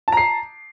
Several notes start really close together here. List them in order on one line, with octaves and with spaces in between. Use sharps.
A5 A#5 C7